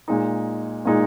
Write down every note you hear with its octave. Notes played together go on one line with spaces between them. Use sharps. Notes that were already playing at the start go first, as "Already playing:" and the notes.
A#2 G#3 D#4
A#2 G#3 D#4